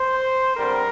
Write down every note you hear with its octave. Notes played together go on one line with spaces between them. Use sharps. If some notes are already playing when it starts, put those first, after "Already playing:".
Already playing: C5
D3 G3 C4 A#4